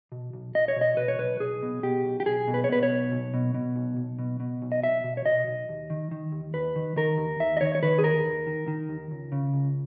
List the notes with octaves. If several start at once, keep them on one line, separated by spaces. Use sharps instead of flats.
B2
B1
B1 D#5
C#5
B2
D#5
B2 B4
C#5
B1 B4
B1 G#4
B2
B2 G4
B1
G4
B1 G#4
B2
B4
C#5
B2 B4
C#5
B1
B1
B2
B2
B1
B1
B2
B2
B1
D#5
B1 E5
B2
C#5
B2 D#5
B1
D#2
D#3
D#3
D#2
D#2 B4
D#3
D#3 A#4
D#2
D#2 E5
D#5
D#3 C#5
C#5
D#3 B4
G#4
D#2 A#4
D#2
D#3
D#3
D#2
C#2
C#3
C#2